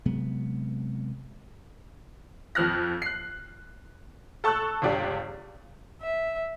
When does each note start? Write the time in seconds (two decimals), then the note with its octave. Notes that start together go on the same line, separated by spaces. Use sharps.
0.05 C3 F#3 G#3 B3
2.55 F2 F3 F6 F#6 A#6
3.02 F#6 C7
4.44 A4 A5 C#6 E6 F#6
4.82 G1 C#2 D4 G4
6.02 E5